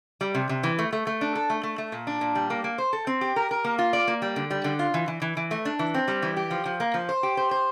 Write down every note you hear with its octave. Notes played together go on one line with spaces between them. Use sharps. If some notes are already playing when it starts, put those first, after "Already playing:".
G3
C3
C3
E3
A3
A3
A3
D4
A4
A3
A3
A3
A#2
D4
A#2
G3
A#3
A#3
C5
A4
C4
G4
A#4
A#4
A#3
F4
D5
A#3
G3
D3
G3
D3
F4
E3
E3
E3
E3
A3
D4
E3
C4
G3
E3
G4
F3
F3
A#3
F3
C5
G4
C5
C5